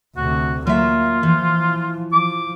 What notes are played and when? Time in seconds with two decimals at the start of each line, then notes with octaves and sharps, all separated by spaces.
0.17 D2 C3 F#4
0.67 F#3 A#3 F4 E5
1.23 E3 F3
2.13 F3 D6